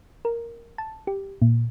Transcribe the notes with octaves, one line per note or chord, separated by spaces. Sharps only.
A#4
A5
G4
A#2